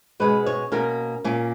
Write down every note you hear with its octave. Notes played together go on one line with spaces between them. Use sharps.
B2 G#3 C#4 B4
C#5
B2 A#3 C#4 A#4
A#2 A#3 C#4